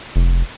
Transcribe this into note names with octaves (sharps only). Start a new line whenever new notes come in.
F1